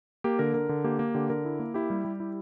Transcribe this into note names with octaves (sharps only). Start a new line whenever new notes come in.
A#3 G4
D3 A#4
D3 A#4
D3
A#3 G4
A#3
D3 G4
D3 A#4
E4
A#3
E4 G4
G3
G3
E4